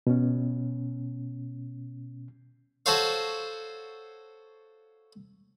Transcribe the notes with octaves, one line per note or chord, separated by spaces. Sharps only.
B2 C#4
F#4 A4 C5 C#5 F5